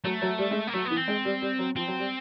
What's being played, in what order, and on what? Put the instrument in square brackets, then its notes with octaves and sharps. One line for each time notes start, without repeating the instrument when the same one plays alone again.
[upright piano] F#3 [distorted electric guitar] A3
[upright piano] F#3
G3
G#3
[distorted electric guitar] A#3
[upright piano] F#3 [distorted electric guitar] A3
[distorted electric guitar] B3
[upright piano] E3
[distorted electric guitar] C4
[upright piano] G#3
G3
G3
F#3
[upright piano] F3 [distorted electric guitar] C4
[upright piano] F#3
G3